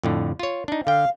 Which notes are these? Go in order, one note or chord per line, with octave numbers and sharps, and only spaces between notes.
F2 A2 D3
F4 C#5
D4 D#4
D3 F5 G5